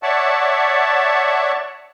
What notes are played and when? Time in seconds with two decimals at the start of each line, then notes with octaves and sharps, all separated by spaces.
0.03 C#5 D5 E5 F#5 A5